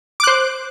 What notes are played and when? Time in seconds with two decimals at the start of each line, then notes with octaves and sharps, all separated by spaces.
0.20 D6
0.24 F#6
0.27 C5